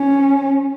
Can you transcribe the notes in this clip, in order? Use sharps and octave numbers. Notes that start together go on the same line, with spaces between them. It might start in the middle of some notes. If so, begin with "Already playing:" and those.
Already playing: C#4